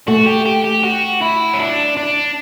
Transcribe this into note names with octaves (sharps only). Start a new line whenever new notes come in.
A3 F#4
G4
G4
G4
F#4
E4
C#4
D4
D4